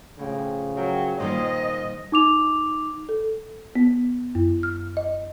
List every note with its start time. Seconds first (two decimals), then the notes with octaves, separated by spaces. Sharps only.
0.19 A2 C#3 F3 G4
0.77 F#3 A#4 G5
1.20 A#2 D#3 G3 A#3 G#4 C5 D#5
2.12 D#4 D6 F7
3.09 A4
3.76 B3
4.35 F#2
4.63 F6
4.97 D#5